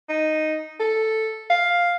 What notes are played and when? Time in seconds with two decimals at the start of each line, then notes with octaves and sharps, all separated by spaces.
0.09 D#4
0.80 A4
1.50 F5